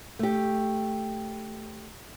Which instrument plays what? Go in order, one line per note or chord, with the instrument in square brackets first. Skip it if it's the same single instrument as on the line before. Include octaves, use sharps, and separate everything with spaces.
[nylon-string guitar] A3 G4